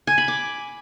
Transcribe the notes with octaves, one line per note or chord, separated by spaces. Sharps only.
G#5
B5
D6